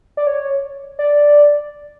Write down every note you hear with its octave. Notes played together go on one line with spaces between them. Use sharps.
D5
C#5
D5